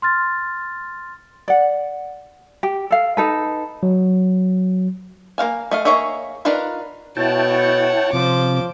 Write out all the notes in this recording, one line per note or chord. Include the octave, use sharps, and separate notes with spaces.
C6 F6 A6
D5 F#5
G4
A4 F5
D#4 A4 B4
F#3
A#3 F#4 F5 G#5
A3 D#5 F5
A#3 G#4 C#5 D#5 E5
D4 D#4 F4 A#4 B4
B2 E4 C#5 F#5 G5 A5
C3 F3 C5 D6